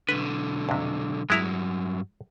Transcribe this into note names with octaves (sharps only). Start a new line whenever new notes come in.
B1 D3 B4
F2 C3
G2 F#3 G#3 E4 A#5